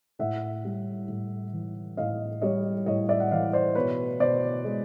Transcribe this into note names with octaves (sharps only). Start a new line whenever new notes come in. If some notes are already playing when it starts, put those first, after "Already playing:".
A2 E5 F#5
G3
A2
E3
A2 D#5 F5
G3 C#5 D#5
A2 C#5 D#5
D5 E5
F#5
E3 D#5 F5
C5 D5
B2 B4 C#5
B2 C5 D5
G#3